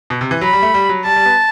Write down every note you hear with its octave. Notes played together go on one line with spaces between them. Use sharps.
B2
C3
E3
F#3 B5
G3
A3
G3
F#3
G3 A5
G3
B3